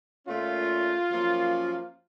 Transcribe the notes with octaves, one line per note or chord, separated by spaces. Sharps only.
A#2 A3 C#4 F4
F#2 F3 A#3 C#4